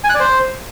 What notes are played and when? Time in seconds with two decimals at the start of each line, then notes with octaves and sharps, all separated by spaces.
0.04 G#5
0.09 F#6
0.15 D5
0.20 C5